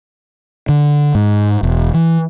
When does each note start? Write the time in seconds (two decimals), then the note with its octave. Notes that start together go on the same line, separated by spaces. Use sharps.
0.69 D3
1.15 G#2
1.63 E1
1.94 E3